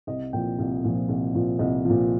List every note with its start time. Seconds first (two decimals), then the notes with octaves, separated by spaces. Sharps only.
0.07 C2 D#5
0.33 A#2 F3 G5
0.59 C2
0.84 A#2 F3
1.09 C2
1.35 A#2 F3
1.59 C2 D#5
1.85 A#2 F3